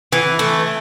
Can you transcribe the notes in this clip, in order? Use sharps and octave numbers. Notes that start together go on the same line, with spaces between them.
E3
A3